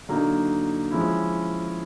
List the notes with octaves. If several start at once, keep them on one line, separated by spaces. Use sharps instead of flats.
D3 F#3 A#3 D#4
F3 G#3 C#4 E4